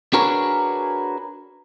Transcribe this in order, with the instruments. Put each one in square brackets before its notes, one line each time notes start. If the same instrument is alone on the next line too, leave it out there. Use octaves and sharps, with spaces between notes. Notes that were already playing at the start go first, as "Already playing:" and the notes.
[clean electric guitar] D4 F#4 G#4 A#4 B4 C#5